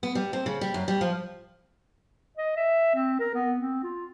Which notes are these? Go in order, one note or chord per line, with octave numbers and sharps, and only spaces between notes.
B3
G3
C4
C#3
G3
F#2
G3
F3
D#5
E5
C4
A#4
B3
C4
F4